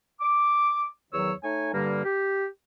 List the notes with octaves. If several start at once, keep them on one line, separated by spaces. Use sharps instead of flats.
D6
E2 D#3 F#3 C#5 E6
A3 D#4 C#5 G#5
G2 D3 G3 A#3
G4